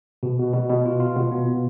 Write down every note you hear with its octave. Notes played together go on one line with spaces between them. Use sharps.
B2
B2
B2
B2
F4
F4
B2
B3